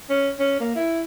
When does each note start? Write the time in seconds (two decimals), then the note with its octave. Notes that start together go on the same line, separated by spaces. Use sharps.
0.10 C#4
0.39 C#4
0.60 A#3
0.75 E4